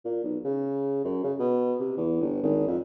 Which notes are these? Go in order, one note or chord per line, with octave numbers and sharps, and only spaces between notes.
A#2
B1
C#3
F#2
C#3
B2
C3
E2
G1
G#1
F2